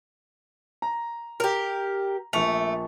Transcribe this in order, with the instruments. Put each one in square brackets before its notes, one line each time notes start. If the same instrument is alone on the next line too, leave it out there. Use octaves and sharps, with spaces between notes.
[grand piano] A#5
[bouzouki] G4 A#4
[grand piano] A#1 C#6 F7 [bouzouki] A3